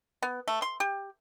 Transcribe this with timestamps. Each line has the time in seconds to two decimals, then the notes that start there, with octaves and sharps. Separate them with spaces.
0.22 B3
0.48 A3
0.62 C6
0.80 G4